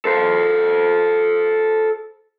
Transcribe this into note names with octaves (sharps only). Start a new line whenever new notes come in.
A4 C5